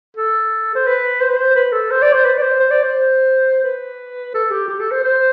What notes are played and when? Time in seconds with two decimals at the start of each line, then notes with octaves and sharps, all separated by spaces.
0.17 A4
0.75 C5
0.87 B4
1.21 C5
1.30 B4
1.37 C5
1.56 B4
1.72 A4
1.91 C5
2.02 D5
2.13 C5
2.25 B4
2.37 D5
2.42 C5
2.60 C5
2.71 D5
2.83 C5
3.64 B4
4.34 A4
4.51 G4
4.68 G4
4.80 A4
4.91 C5
5.03 C5